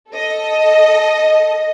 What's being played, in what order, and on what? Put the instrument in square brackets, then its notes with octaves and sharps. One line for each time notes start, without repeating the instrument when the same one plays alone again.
[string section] A4 D#5